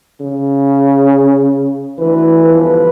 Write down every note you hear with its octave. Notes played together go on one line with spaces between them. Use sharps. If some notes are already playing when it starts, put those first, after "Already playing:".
C#3
D2 E3 B4
G1 F3 B4